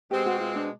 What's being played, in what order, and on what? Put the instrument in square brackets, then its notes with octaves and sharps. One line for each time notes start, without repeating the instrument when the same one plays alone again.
[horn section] B2 G#3 C4 [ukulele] G4
[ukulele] F#4
F4
D4